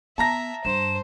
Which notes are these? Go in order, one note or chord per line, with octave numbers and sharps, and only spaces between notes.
B3 E5 A5 A#5 A#6
G2 C5 E7